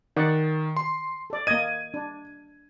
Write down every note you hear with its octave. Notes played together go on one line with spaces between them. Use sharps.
D#3 D5 F#5
C6
A4 D5
A#3 D#5 G#6 D#7
D4